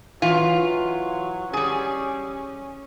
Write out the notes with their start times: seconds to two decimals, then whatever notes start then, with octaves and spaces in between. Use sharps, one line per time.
0.22 E3 F#3 F4
1.53 G3 C#4 G#4